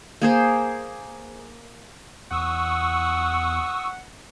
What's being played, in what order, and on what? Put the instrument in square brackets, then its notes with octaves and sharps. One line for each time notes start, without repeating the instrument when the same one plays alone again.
[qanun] A#3 G#4 C5
[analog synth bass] E2 [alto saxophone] F#5 [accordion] C#6 D#6 E6